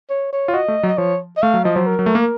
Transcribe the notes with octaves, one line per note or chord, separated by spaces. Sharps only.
C#5
C#5
F4
F#4 D#5
A3
F#3
D#5
F3 C#5
D#5
A3 F5
F#3
F3 D#5
F#3 C5
A#4
F#3
A3
A#3